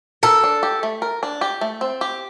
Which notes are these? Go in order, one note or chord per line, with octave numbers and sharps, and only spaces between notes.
A4 A#4
D4
G4
A3
A#4
D4
G4
A3
C4
G4